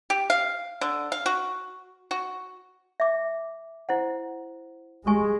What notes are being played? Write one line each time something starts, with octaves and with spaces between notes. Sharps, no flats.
G4
F5
D3
F5
F#4
F#4
E5 D6
E4 C5 F#5
G#3 G4 G#5 C#6